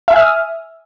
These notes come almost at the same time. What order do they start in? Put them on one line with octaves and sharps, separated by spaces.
E5 G#5 F6 D#6